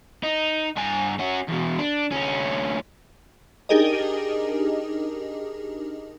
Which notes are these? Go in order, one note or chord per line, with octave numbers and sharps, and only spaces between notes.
D#4
G2 G#5
C#4 F#4
E2 B2
D4
D2 C#4
D4 D#4 G4 G#4 A#4 D#5